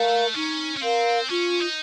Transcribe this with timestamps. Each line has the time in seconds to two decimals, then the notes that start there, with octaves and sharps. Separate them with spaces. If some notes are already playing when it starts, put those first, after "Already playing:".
Already playing: A3 A#4 F5
0.34 C#4 D#4
0.76 C#4
0.81 C4 A#4 F5
1.28 C#4 F4
1.60 D#4